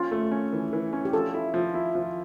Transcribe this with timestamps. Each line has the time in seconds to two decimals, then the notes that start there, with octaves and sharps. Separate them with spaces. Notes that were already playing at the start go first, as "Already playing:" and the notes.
Already playing: C#4 F4
0.11 A3
0.31 C#4
0.53 E3
0.73 E3
0.93 C#4
1.05 G4
1.13 F3 A4
1.34 E4
1.54 F3
1.74 E4
1.95 F3